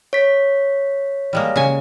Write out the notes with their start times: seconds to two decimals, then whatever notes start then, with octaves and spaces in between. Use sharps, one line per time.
0.13 C#5 B6
1.33 G3 G#3 A#3
1.56 C#3 G#5